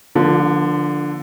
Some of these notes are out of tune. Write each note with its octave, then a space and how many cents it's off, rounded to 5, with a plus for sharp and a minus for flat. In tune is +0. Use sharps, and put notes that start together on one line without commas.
D3 +0 F3 +0 A#3 +45